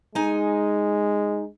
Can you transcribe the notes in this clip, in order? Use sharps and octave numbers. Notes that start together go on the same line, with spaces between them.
G#3 D#4 G#5